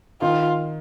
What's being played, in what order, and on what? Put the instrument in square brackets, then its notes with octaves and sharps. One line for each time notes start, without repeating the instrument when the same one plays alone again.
[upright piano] D#3 [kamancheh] F4